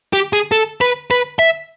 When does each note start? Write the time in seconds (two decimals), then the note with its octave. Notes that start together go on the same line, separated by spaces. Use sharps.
0.13 G4
0.33 G#4
0.52 A4
0.81 B4
1.11 B4
1.39 E5